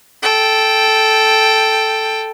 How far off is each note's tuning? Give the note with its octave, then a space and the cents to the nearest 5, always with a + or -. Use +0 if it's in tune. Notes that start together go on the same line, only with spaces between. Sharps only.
A4 -5 G5 +0